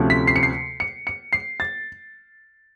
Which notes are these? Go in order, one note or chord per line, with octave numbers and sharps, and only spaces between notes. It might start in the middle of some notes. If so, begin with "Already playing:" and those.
Already playing: D2 C3 F3 A3 C#4
B6
C7
C#7
C7
C#7
C#7
C7
A6